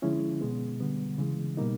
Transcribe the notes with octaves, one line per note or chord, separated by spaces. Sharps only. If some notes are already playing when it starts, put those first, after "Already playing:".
D3 F3 G#3 C#4 E4
B2 G#3 B3
D3 G3 B3
C#3 E3 G#3
B2 G3 A#3 D#4